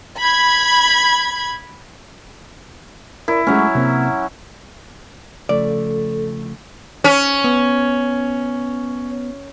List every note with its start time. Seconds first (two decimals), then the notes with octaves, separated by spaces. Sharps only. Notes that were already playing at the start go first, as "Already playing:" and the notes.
0.17 B5 G#6
3.28 E4 A#4 D5
3.47 F#3 G#3 A3 C#4
3.75 C3 A#3 C4
5.49 C#3 F3 A3 A4 D5
7.04 C#4
7.44 B3